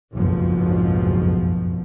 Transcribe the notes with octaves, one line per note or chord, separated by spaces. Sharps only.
F#1 B1 F2 G#2 B2 F3